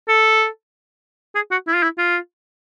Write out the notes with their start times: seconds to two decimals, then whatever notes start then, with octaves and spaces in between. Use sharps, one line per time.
0.08 A4
1.35 G#4
1.52 F#4
1.67 E4
1.75 F4
1.83 E4
1.98 F4